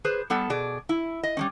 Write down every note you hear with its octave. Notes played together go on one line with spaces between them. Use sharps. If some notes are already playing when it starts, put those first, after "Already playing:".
G#4 B4 C5
G3 B3 A4
B2 G#4 D5
E4
D#5
G3 G#3 C#4